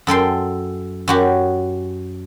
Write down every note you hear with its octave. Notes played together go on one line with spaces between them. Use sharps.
F#2 A4 G5 C6
F#2 F#4 G4